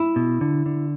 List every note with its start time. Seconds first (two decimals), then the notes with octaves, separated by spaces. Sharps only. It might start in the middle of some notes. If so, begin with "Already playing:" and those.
Already playing: E4
0.16 B2
0.41 D3
0.66 D3